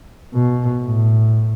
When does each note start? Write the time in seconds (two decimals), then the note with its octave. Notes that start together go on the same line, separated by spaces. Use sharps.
0.34 B2
0.83 A2